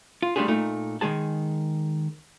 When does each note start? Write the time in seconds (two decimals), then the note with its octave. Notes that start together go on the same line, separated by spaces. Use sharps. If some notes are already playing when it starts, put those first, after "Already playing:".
0.22 F4
0.36 G3 A3 D4 F4 G4 G#4
0.48 A#2 A3 D#4
1.01 D#3 G#3 G#4 A5